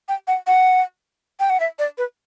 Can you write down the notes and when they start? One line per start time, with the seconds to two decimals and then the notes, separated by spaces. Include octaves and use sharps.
0.09 G5
0.28 F#5
0.47 F#5
1.40 G5
1.50 F#5
1.60 E5
1.79 D5
1.98 B4